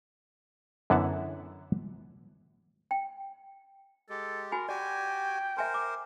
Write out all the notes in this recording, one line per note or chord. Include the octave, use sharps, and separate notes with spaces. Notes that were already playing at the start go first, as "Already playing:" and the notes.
F#2 D3 E3 B3 F#5 A5
G5
G#3 G4 A4
F#4 A#4 G#5 B5
F#4 G4 D5 G5 G#5
A#4 C5 E5 G#5 C6
D6